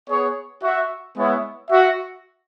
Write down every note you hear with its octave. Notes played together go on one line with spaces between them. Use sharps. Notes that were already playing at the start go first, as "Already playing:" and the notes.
B3 G#4 C#5
F#4 E5
G#3 B3 E4 C#5
F#4 E5